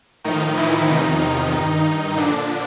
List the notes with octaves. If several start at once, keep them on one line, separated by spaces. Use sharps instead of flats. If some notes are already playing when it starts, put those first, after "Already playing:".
A2 D#3 F3 D#4
E3 E4
E2 C3 D#3 F3 D#4
G2 D#3
A#2 D3 F3 D4